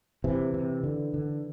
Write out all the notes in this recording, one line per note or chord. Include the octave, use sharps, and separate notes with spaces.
C3 E3
C3
D3
D3